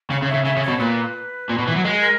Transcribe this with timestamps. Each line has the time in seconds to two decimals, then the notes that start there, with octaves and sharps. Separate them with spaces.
0.10 C#3 C#5
0.22 C#3
0.28 E5
0.34 C#3
0.45 C#3 E5
0.57 C#3
0.63 C#5
0.68 B2
0.79 A#2 B4
1.50 A#2
1.58 B2
1.67 E3
1.76 F#3
1.84 G#3 A#4
1.93 G#4
2.00 A#4